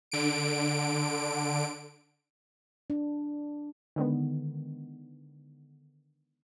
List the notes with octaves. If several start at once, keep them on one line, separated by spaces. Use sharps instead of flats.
D3 D7
D4
D3 D#3 G#3 B3